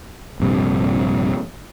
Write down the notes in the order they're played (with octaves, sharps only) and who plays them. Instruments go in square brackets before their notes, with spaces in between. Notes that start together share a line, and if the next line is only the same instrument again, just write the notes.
[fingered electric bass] A#1 G2 C3